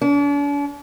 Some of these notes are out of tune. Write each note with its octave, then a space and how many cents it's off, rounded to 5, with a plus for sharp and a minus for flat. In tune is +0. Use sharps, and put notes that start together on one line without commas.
D4 -45